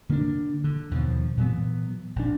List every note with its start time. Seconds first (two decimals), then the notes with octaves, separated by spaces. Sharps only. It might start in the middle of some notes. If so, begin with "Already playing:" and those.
0.09 D3 A#3 B3 D4
0.64 D3
0.91 D#2 B2 D#3 F3
1.37 A#2 E3 F#3 B3
2.16 A#1 D4